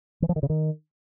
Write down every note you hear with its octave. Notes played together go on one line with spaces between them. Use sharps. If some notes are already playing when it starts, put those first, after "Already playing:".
E3
F3
D#3
C#3
D#3